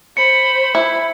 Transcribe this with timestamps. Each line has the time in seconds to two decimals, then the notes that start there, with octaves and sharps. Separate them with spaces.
0.17 C5 B5 C#7
0.75 E4